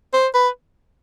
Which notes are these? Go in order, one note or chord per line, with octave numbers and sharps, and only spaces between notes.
C5
B4